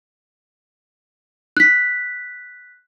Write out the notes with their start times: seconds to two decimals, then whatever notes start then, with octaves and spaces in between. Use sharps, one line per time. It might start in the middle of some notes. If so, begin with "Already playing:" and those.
1.57 F#6 B6